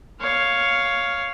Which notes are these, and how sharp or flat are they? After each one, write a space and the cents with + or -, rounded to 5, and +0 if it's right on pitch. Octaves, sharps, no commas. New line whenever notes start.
C#5 +5 F5 +0